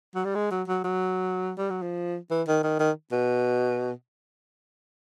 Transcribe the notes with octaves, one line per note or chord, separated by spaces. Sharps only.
F#3
G3
G#3
F#3
F#3
F#3
G3
F#3
F3
E3
D#3
D#3
D#3
B2